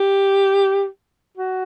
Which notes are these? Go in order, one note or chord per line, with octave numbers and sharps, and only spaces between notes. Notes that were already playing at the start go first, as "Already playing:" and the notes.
Already playing: G4
F#4